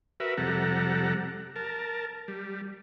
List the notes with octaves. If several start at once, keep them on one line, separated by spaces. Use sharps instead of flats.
F#4 A#4 B4 E5
F2 C3 G3 A4 F#5 A#5
A#4 A5
G3